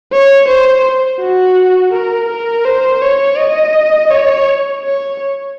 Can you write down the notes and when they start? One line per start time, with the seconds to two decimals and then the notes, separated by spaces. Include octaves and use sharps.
0.12 C#5
0.48 C5
1.20 F#4
1.93 A#4
2.29 A#4
2.65 C5
3.02 C#5
3.37 D#5
4.10 C#5
4.83 C#5